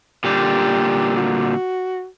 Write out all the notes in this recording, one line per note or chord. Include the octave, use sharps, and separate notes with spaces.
A#2 D3 G3 G4
F#4